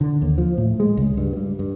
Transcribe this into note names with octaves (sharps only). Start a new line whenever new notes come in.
D3
D#2
F3
A2
G#3
C#2
G2
G3
G2